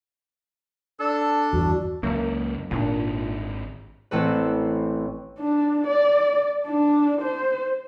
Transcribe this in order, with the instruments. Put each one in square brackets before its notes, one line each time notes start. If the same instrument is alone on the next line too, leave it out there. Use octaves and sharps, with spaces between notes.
[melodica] D4 [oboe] A4
[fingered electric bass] E2 G2 E3 [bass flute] F#4
[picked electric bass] C#2 F#2 [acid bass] A#3
[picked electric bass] G#1 D3 D4 [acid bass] A#2
[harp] A1 C4 A4 B4
[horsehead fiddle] D4
D5
D4
C5